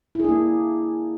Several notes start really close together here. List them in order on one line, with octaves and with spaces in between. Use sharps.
E4 G#4 D4 A#3